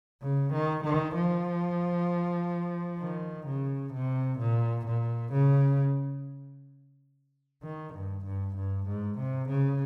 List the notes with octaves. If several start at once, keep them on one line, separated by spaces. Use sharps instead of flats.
C#3
D#3
D#3
F3
D#3
C#3
C3
A#2
A#2
C#3
D#3
G2
G2
G2
G#2
C3
C#3